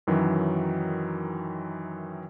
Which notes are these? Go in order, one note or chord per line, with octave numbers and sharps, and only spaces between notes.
F#2 D#3 E3 F#3